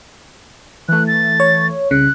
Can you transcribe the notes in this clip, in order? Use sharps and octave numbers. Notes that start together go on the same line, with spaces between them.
E3 A3 F#6
A6
C#5
C2 C#3 F#6